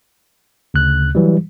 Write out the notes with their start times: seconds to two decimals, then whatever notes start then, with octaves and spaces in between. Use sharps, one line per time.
0.74 D2 C#3 F#6
1.15 E3 F#3 G3